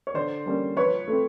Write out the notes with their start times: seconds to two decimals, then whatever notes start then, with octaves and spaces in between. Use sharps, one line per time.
0.07 C#5
0.14 D3 C5 D5
0.46 G3 A#3 C#4
0.77 F3 B4 C#5
1.08 A3 C4